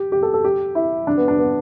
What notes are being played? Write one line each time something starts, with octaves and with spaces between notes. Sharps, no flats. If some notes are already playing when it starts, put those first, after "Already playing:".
Already playing: G4
G4
A4
A4
G4
E4
D4
B3
D4
B3